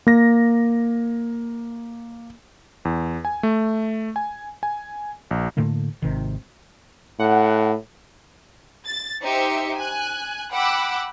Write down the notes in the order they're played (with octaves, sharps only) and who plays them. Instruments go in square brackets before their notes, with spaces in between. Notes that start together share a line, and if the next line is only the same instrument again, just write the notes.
[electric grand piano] A#3 A#6
E2
G#5
A3
G#5
G#5
A#1
[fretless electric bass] A2 D3 A3 A#3
G#1 C3 D#3
[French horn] A2 [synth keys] F#5
[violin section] A6
D#4 G4 C5 E5 C#7
G#5 F#6
F#5 G5 B5 D6 E6 F#6